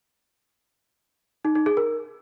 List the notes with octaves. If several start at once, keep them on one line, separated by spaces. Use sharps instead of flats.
D#4
D#4
G#4
A#4